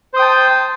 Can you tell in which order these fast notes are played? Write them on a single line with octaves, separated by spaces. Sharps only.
C5 D#6 G5 A5